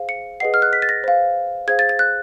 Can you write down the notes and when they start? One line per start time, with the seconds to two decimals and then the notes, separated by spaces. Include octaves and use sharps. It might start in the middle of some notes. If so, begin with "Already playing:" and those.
Already playing: G#4 C5 F5
0.09 C#7
0.40 G#4 B4 D#5 F#5 C7
0.54 F6
0.62 F#6
0.73 B6
0.82 A6
0.89 A#6
1.04 C5 F5
1.67 G#4 C5 F5 G#6
1.79 A6
1.89 A6
1.99 F#6